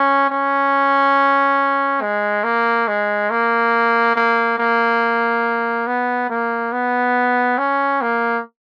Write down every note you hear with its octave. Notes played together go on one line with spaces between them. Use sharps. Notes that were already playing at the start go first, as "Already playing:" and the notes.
Already playing: C#4
C#4
G#3
A#3
G#3
A#3
A#3
A#3
B3
A#3
B3
C#4
A#3